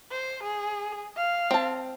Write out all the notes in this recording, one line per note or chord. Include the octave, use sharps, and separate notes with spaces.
C5
G#4
F5
C4 A5